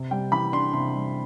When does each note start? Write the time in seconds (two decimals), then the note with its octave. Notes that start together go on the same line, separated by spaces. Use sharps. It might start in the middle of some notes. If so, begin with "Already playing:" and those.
Already playing: C3
0.11 G3 G5
0.32 E3 B5
0.52 D4 C6
0.73 C3 C6
0.94 G3